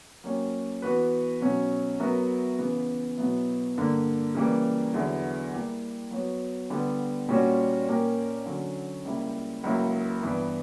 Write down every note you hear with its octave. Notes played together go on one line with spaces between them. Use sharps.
F#3 A#3 C#4 G4 C#5
E3 B3 F#4 B4
B2 F#3 C#4
F#3 B3 F#4 A#4 E5
C#3 E3 B3
B2 F#3 B3 E4
G2 D3 A#3
C#3 E3 G3 A#3
E2 D3 F#3 B3 E4
G3 A#3 E4 G4
F#3 B3 F#4 C#5
D3 G3 B3
A#2 G3 C#4 F#4 C#5
A#2 A#3 C#4 G4 A#4
D3 F#3 C#4
C#2 C#3 G3 A#3 E4
C#2 C#3 F#3 A#3 E4
G2 E3 B3 E4